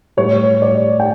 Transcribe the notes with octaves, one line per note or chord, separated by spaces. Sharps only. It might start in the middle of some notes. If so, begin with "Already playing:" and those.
A2 G3 C#5
D5
G5